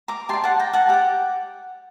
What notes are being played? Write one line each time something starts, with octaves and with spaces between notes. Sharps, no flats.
A#5 D6
G4 D5 A5 C6
F#5 A5
G5 A#5
F#5 A5
G4 D5 F#5